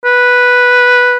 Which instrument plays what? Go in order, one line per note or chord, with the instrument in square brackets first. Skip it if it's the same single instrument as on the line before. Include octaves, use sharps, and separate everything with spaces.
[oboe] B4